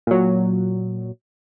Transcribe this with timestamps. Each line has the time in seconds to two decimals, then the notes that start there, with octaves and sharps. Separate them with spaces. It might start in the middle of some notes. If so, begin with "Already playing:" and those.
0.07 A#2 F#3